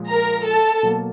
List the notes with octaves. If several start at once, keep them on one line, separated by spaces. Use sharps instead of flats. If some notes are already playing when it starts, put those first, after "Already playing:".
Already playing: A#2 F3 G#3
A#4 A#5
A4 A5
B2 F#3 A#3